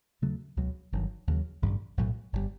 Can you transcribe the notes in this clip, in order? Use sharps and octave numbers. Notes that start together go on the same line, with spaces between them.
D#2 C#3 F#3 A3
C#2 B2 F#3
G1 G2 D#3 F#3
D#2 C#3 F#3
A1 G2 D3 G3
B1 A2 F#3 A3
G1 D3 G3